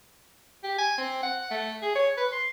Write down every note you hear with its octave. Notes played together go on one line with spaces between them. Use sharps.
G4
G#5
C4
F#5
A3
G#4
C#5
B4
C6